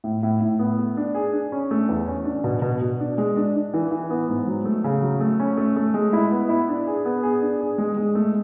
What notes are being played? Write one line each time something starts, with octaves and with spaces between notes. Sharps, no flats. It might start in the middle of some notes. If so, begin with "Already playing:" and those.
A2
A2
A2
B3
A3
D4
G#4
D4
C#4
A3
E2
C#4
D4
B2
B2
B2
D4
G#3
D4
D4
E3
E3
B3
G#2
F#3
A3
C#3
F#3
A3
C#4
A3
A3
G#3
E4
B3
E4
D4
G#4
B3
G#4
D4
G#4
G#3
G#3
A3